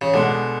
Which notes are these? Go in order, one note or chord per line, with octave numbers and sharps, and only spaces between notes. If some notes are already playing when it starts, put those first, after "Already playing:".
C#3
B2 D3 G#3 B3